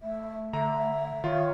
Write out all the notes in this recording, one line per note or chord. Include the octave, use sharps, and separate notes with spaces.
A3 E5
D3 E5 A#5
D#3 F4 C#5